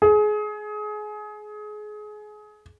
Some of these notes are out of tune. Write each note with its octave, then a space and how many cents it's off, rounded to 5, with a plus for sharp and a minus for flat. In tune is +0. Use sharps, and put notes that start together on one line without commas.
G#4 +25